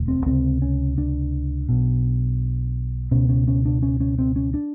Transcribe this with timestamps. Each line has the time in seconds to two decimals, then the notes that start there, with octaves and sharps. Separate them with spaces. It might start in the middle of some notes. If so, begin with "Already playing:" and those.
Already playing: E1 D2 D3
0.08 C4
0.26 C#2 C3 C4
0.62 C#4
0.98 D4
1.69 B1 B2
3.11 C#2 B2 C#4
3.29 C#4
3.48 C#4
3.65 D4
3.83 C#4
4.00 C#4
4.19 C4
4.36 C#4
4.54 D4